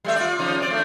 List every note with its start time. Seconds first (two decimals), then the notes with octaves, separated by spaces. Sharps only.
0.04 G3 A3 E5
0.16 F4 D5
0.39 C#3 F3 D#4
0.58 C4 D5
0.70 A3 D4